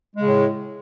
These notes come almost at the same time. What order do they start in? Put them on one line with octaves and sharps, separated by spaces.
G#3 C#3 A2